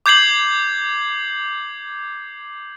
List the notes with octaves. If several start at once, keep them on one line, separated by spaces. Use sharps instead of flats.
D6 G6 G#6 C7 F#7